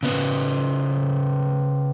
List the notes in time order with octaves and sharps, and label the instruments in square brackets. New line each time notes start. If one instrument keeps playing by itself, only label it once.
[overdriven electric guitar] C#3 B3